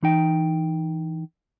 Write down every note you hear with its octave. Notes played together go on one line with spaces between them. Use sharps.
E3 D#4 G5